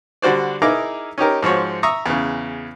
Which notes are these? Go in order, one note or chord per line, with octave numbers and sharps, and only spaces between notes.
D3 G3 F#4 C5 D5
D#4 E4 G#4 A#4 A#5 D6
C#4 D#4 G4 A#4
G#2 F3 F#4 C#5
E5 A#5 C#6 D#6
E2 C#3